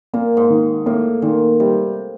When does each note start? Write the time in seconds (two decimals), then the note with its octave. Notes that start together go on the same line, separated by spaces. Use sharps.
0.13 A#2 A#3
0.37 G#2
0.50 D#3
0.86 A2 A#3
1.22 A#2 D#3
1.60 C3 G3